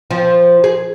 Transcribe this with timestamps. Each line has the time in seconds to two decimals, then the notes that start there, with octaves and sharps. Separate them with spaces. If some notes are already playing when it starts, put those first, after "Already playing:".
0.11 F3
0.64 G#4